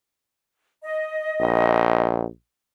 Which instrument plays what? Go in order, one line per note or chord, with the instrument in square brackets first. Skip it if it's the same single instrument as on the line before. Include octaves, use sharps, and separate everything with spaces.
[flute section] D#5
[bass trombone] A#1